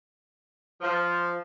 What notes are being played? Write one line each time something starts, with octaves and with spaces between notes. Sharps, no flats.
F3